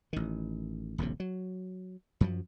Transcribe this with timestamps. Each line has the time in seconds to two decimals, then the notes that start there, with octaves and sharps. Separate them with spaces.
0.13 A1 D#3
0.98 D#1 A#1 A2 C3
1.20 F#3
2.21 F#2 F3 F#3